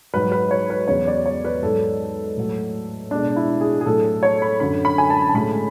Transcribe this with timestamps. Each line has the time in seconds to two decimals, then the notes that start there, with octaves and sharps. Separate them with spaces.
0.14 G#2 F#3 B4
0.32 B4
0.51 C#5
0.70 B4
0.88 E2 C#3 F#3 C#5
1.07 D5
1.26 C#5
1.45 B4
1.62 G#2 F#3 A4
2.37 A2 F#3
3.11 B2 G#3 D4
3.36 E4
3.61 G#4
3.81 G#4
3.86 A2 F#3 A4
4.23 C#5
4.42 B5
4.60 F#2 D3 F#3 B5
4.85 B5
4.98 G#5
5.10 A5
5.29 A5
5.34 A2 G#3 B5